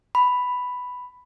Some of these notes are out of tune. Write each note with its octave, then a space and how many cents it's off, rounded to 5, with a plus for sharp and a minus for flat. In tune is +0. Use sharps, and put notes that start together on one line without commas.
B5 +5